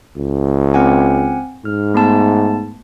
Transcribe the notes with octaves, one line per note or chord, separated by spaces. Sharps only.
C#2
C4 F#5 G#5
G#2 F6
A3 B3 A5